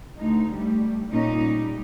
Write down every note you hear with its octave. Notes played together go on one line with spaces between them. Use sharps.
D2 D#4
G3 A3
A#2 C#4 D#4
G3